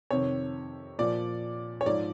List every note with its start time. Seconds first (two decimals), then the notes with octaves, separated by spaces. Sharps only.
0.11 F2 C3 D#3 C#5
0.99 A#2 F3 D5
1.81 C#5
1.86 G#2 F3 D5